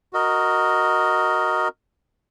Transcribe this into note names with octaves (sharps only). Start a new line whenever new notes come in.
F#4 A#4 D#5